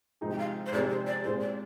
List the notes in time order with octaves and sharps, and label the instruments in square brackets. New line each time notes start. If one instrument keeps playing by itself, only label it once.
[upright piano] C3 F3 G#3 D#4 G#4
[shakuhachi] G5
F5
C5
[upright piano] C3 F3 G#3 D#4 G#4 [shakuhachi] D5
[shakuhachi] C5
D5
[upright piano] A#2 G#3 C4 F4 G#4 [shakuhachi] C5
[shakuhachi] D5